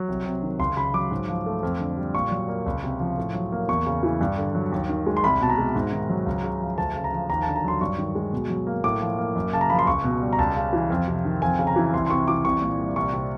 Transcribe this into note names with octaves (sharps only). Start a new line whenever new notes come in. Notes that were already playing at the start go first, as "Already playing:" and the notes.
Already playing: F#3
C2
C3
D#3
C#2 C6
C#3 B5
F#3 D6
G#2
F3
A3
F2
D3
G3
A#2 C#6
F#3
A#3
C#2
C3
F3
A2
F#3
A#3
E2 C#6
C#3
E3
G2
D3
F#3
D#2
D#3
G#3
C6
C2 B5
B2 A5
A#5
G#3
G#2
D#3
F#3
C#2
C#3
F3
D2 A5
C#3
A#5
F3
D#2 A#5
D3 A5
A#5
F#3 C6
G2 C#6
D#3
G#3
B2
F#3
A#3
A2 D6
F3
A#3
F#2
C#3 A5
A#5
F3 B5
C6
C#2 C#6
B2
G3
A#5
C#2 A5
C#3
E3
F2
C3
D#3
F2 G#5
C#3
A#5
E3
C2 C6
C6
C3 C#6
E3 D6
C2 C#6
A#2
G3
C2 C#6
C3